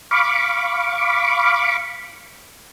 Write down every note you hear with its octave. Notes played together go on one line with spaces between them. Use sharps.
F5 B5 C#6 D6